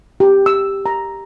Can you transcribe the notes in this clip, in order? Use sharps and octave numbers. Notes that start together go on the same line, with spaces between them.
G4
E6
A#5